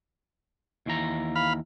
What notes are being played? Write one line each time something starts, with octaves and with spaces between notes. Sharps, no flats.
D#2 E3 A#5
F5 B5